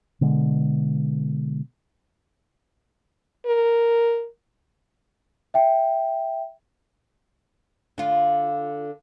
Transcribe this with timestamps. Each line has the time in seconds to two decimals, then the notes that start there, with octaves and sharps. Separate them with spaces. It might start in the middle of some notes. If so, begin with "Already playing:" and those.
0.21 B2 D3 G#3
3.46 A#4
5.54 E5 G5
7.98 D3 F4